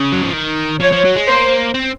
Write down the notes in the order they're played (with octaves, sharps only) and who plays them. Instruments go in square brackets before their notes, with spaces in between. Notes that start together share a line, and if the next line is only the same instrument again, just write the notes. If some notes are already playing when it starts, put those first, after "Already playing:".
Already playing: [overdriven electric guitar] C#3
F#3
F3
D#3
[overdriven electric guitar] F3 [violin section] C#5
[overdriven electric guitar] F3
F#3
G#3
[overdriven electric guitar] A#3 [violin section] C5
[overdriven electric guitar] C4